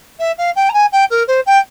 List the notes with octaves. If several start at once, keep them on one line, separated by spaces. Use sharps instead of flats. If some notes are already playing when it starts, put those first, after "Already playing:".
E5
F5
G5
A#5
G#5
G5
A#4
C5
G5